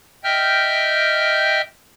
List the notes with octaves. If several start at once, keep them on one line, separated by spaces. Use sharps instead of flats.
D#5 E5 G5 F6 G6